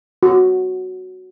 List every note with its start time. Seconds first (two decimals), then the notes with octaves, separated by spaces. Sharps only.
0.23 F#4